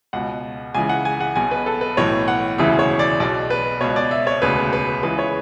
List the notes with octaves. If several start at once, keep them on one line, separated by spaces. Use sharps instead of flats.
C#2 B2 F#5
C#2 C#3 E3 G#5
F#5
G#5
F#5
B1 B2 G#5
B4
A4
B4
B1 A2 E3 C#5
F#5
E1 D2 C#3 E3 E5
C#5
D5
B1 B2 D5
B4
C#2 B2 C#5
D5
E5
C#5
E1 D2 C#3 B4
B4
C#2 C#3 E3 B4
C#5